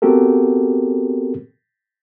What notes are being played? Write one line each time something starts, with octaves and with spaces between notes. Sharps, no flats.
B3 C4 F#4 G4 A4 A#4